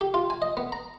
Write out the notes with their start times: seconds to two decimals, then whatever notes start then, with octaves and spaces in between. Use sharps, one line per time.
0.01 G4
0.14 F4
0.30 G#5
0.42 D#5
0.57 B3
0.72 A#5